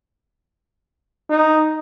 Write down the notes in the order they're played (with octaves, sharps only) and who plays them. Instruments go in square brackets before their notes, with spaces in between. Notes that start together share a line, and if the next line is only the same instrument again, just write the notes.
[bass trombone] D#4